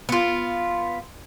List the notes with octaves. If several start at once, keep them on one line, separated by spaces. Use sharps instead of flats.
B3 F4